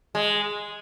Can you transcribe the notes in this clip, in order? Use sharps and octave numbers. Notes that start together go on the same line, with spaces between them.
G#3